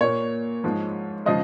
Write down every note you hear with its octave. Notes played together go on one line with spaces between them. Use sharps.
A#2 A#3 C#5
G#2 F3 G#3
C#3 F3 G#3 D#5